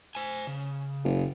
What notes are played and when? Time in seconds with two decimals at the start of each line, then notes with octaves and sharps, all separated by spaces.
0.15 C5 G#5
0.47 C#3
1.04 F#1